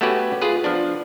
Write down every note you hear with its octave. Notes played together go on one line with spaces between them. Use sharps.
A3 B3 C#4 F#4 G4 B4
F4 G#4 B4
F3 B3 D4